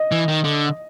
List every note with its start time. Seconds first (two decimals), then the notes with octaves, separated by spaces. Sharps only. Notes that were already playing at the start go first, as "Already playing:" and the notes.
Already playing: D#5
0.12 E3
0.28 D#3
0.44 D3